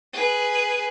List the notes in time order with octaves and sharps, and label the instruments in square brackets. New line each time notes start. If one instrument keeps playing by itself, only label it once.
[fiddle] G#4 B4